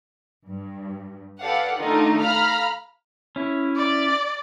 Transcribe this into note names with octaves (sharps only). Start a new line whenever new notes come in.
G2
G4 A4 B4 D5 F5 F#5
D#3 A3 D4 D#4 F4
F5 A#5 B5 F6
C#4 E4
D5